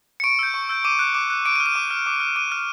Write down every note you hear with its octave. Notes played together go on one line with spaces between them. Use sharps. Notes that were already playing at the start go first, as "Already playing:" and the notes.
C#7
C#6 D7
E6 G6
C#6
E6 G6
D6 D#7
F#6
D6
F#6
D6 D7
D#7
F6
D#7
D6
F6
D6
F6
D6 D#7
F6